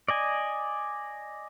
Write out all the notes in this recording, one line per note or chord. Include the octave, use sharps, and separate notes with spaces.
D5 D#5 G#5